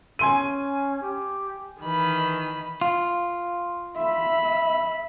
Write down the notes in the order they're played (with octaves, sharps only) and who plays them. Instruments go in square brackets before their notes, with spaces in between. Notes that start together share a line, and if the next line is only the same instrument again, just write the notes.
[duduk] C#4 [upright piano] G#5 C6 D#7
[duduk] G4
[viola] D#3 B5 [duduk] E3
[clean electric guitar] F4
[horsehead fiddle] E5 [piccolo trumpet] B5